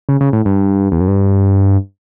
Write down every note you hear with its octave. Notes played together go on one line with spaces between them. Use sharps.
C#3
C#3
A2
G2
E2
F#2
G2